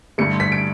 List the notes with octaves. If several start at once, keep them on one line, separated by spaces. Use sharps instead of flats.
G2 D3 A3 C#7
B6
D7